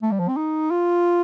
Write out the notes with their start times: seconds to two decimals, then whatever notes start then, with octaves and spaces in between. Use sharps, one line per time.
0.03 A3
0.12 G3
0.20 F3
0.28 C4
0.37 D#4
0.71 F4